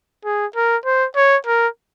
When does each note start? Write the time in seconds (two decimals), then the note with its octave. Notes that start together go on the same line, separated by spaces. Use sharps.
0.25 G#4
0.55 A#4
0.85 C5
1.16 C#5
1.46 A#4